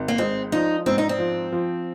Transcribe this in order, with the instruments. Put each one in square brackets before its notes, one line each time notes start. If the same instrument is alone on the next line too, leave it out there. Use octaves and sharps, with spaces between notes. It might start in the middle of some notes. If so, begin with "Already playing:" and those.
Already playing: [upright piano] G#1
[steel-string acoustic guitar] A#3
[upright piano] G#3 [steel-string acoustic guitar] C4
[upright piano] F3 [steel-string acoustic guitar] D#4
[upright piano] G#2 [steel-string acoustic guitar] C4
[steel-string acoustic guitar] D#4
C4
[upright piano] F3
F3